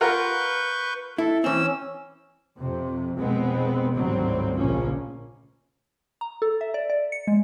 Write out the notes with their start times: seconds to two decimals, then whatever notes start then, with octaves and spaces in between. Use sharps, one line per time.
0.01 F4 A#4 B4 F#5 C#6 G6
1.18 E4 A4
1.44 E3 C4 C#4 E6
2.57 F2 C3
3.17 F1 B2 G#3 B3 C4
3.95 G#1 D2 A2 F#3 G3 C4
4.57 A#1 C#3 F3 A#3 C#4
6.21 A#5
6.42 A4
6.61 E5
6.74 D5
6.90 D5
7.12 C#7
7.27 G#3